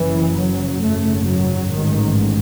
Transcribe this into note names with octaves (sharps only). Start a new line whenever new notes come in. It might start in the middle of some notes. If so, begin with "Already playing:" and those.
Already playing: F#1 F#2 C#3 E3
F#3
G#1 F#2 C#3 A3
F#3
A1 G#2 D#3